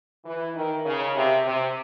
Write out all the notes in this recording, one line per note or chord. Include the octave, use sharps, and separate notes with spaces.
E3
D#3
C#3
C3
C3